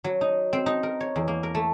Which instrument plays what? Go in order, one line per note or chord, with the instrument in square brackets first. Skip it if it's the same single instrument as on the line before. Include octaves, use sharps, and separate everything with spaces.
[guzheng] F#3
D#4
C4
D#4
A#4
C#5
E2
A#3
A#4
A3